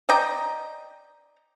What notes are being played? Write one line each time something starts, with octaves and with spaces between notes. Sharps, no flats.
D5 D#5 G5 A#5